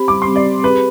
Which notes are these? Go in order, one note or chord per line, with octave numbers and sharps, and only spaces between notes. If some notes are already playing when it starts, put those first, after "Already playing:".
Already playing: C4 G4 C5 B5
G3 D6
C6
C4
D5
G4
G#4 B4